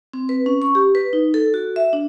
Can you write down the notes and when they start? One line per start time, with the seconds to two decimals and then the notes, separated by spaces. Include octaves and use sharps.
0.13 C4
0.29 B4
0.46 C#4
0.62 C#6
0.75 G4
0.95 B4
1.13 D#4
1.34 A4
1.54 F#4
1.76 E5
1.93 D4